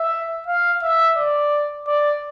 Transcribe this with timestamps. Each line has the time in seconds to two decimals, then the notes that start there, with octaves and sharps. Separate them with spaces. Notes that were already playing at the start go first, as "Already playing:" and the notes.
Already playing: E5
0.47 F5
0.82 E5
1.16 D5
1.87 D5